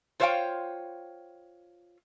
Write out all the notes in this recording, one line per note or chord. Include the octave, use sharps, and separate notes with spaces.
F4 C5 C#5 E5 F5 G5